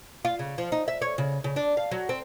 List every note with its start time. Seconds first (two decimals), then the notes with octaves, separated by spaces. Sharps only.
0.25 F4
0.39 C#3
0.58 F3
0.72 D#4
0.88 E5
1.02 C#5
1.18 C#3
1.44 C#3
1.56 D4
1.77 F5
1.91 F#3
2.09 C4